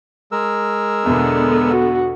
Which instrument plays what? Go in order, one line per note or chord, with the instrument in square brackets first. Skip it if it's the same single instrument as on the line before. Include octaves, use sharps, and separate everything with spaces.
[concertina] G#3 A#4 E6
[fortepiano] E2 B2 [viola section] D3 B3
[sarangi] F#4